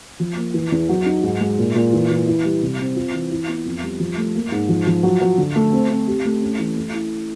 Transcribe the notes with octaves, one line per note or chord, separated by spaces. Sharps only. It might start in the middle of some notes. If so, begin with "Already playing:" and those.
F3
A#3
E3
E2
F#3
D#4
G#2
G#3
A#2
A#2
E3
E3
E4
G3
C3
C4
F4
E3
E4
B3
F2
G3
F3
A3
A#3
G#2
F3
F3
F#3
F#3
D3
A3
C4
C4
G4
A3
C#4
E3
A3
E4